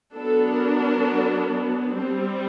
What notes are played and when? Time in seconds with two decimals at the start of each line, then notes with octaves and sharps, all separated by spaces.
0.16 F#3 B3 D4 A4
0.60 A#4
1.94 G3 C4